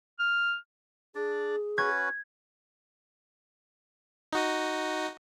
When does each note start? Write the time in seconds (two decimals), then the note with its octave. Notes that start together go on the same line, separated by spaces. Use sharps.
0.19 F6
1.15 D4 G#4 D5
1.78 C#4 F#4 B4 G#6
4.33 D#4 F#4 D#5